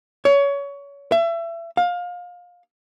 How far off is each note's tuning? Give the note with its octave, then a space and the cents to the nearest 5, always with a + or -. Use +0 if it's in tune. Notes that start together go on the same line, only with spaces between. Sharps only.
C#5 +25
E5 +30
F5 +25